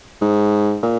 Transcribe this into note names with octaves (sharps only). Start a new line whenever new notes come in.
G#2
A#2